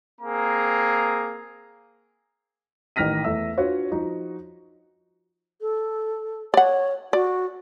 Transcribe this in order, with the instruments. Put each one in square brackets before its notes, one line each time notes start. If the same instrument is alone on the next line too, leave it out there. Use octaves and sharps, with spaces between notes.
[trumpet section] A#3 C4 G#4 A#5
[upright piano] A1 D#3 F6 A#6 B6 D#7
E2 A3 E5 E6
D4 F4 F#4 B4 C#5
F3 D#4 F#4
[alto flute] A4
[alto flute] C#5 [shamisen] D5 F#5
[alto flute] F#4 [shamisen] D5